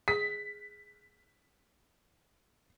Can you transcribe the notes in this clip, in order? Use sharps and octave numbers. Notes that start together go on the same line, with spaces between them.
G#4 B6